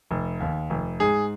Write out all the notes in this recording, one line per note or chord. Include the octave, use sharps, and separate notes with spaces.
F1
D#2
F1
G#2 G#4